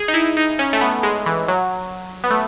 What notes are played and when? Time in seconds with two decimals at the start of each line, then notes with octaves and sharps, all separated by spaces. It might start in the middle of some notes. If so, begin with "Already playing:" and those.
Already playing: G#4
0.08 D#4
0.14 E4
0.37 D#4
0.59 C#4
0.73 A3
0.81 B3
1.03 G#3
1.26 E3
1.48 F#3
2.24 B3
2.30 A3